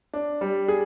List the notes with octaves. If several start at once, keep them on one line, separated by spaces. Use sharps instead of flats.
D4
G3
G#4